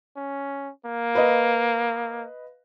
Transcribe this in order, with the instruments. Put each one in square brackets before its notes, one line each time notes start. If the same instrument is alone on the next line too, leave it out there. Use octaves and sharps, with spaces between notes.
[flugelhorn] C#4
A#3
[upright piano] B4 D#5 F5